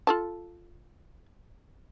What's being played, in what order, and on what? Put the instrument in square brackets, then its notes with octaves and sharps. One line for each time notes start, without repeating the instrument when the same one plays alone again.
[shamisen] F4 A4 A5